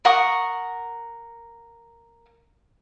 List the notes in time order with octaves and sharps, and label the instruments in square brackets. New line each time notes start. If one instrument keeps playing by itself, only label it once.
[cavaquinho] A#4 F#5 C#6 D#6